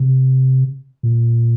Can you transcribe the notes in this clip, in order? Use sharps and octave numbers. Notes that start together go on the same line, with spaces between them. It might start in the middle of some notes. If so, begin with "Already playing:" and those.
Already playing: C3
A#2